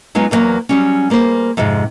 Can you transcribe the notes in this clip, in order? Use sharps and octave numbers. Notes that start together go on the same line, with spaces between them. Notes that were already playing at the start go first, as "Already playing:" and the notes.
F#3 G#3 B3 D#4 F4
E2 D3 F#3 A#3
F#3 G3 C#4
G3 A#3 G#4 C5
F2 G#2 C3 G#3